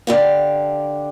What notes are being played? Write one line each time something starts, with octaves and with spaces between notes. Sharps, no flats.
D3 G4 F5